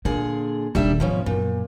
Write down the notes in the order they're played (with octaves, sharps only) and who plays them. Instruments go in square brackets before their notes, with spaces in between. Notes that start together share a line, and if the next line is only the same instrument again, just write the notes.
[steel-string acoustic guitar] A#2 D3 G#4 [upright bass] A#3
[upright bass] D#1 D#3 [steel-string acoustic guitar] G3 D4 E5
[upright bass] G#2 [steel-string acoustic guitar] B2 F3 C#4
[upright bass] F#2 [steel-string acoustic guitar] A#2